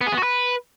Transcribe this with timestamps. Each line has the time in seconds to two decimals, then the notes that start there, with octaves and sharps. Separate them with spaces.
0.01 B3
0.07 G#4
0.12 B3
0.18 F#4
0.23 B4